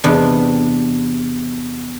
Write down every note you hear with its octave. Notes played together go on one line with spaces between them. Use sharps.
E2 C3 B3 D4